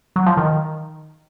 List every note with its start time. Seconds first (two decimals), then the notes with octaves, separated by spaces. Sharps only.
0.16 F#3
0.26 F3
0.37 D#3